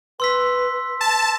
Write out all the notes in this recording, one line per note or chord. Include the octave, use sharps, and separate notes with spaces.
B4 C6 E6 B6
A5